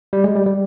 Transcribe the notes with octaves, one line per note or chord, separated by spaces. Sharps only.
G3
G#3
G3
G3